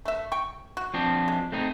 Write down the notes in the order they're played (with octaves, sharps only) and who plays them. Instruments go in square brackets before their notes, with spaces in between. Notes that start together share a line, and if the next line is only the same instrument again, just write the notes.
[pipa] A3 E5
G5 C#6
F#4
[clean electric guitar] F3 C4 D4
[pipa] G#3
[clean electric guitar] A3 C4 D#4